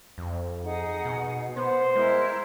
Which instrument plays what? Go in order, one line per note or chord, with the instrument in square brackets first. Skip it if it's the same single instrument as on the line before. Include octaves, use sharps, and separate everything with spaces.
[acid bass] F2
[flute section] D#4 G#4 F#5
[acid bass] B2
[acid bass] B3 [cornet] C5 [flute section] F#5
[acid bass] G#3 [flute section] E4 A#4